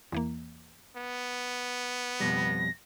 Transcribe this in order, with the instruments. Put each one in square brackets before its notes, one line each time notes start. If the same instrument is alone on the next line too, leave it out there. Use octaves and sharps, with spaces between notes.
[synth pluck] E2 E3 A#3
[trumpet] B3
[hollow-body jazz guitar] F2 B2 G3 [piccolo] A#6